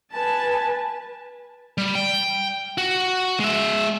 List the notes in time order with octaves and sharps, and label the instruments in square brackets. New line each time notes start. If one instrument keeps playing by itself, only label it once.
[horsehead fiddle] B4 G#5 [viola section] A5
[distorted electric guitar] G3
G5
F#4
G#3 E5